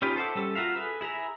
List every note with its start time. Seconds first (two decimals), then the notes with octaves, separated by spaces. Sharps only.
0.02 C#4 D#4 F4 G4 B4
0.16 A4 C5 E5 F#5 D6
0.35 G3 C#4 A4
0.55 F4 F#4 A#4 E5 F5
0.76 G#4 A4 B4
1.01 E4 G#4 E5 A#5